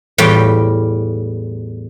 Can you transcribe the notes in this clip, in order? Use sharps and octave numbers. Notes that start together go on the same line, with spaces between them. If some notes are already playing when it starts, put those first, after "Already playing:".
E2 A2 G3 F4 G5